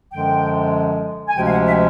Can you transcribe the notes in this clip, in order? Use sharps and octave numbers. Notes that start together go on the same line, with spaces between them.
F#2 D3 F3 G#3 G5
G#5
D2 C3 F3 G#3 C#4 G5
F5
F#5
E5